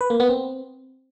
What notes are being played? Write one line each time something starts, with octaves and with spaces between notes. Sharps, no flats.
B4
A#3
B3
C4